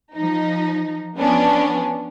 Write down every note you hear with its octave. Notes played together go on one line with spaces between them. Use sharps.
F3 D#4
F3 B3 C#4 D4